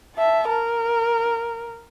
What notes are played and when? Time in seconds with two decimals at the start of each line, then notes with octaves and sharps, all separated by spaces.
0.15 E5 A5
0.48 A#4